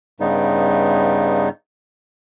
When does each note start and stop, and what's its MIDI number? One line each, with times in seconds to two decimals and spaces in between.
0.20 1.49 43
0.20 1.49 49
0.20 1.49 55
0.20 1.49 59
0.20 1.49 63